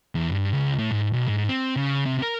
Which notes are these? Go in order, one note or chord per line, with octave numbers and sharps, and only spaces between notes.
E2
G2
C#2
A2
G#2
B1
G#2
C4
C#3
C3
A#4